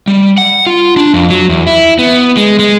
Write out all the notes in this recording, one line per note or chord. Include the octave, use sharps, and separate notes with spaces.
G3
F#5
F4
D4
F2
F#3
E2
E4
B3
G#3
G#3